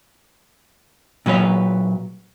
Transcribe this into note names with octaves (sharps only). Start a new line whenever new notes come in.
A#2 F#3 B4 C#5